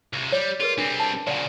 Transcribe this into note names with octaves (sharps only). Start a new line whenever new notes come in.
C#2 C3
G3 C#5 D5
F4 G#4 A#4 B4
G3 C4 D4
A5
A#2 C#3 D5 F#5